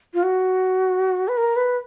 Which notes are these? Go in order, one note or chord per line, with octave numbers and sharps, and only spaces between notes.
F4
F#4
B4
A#4
B4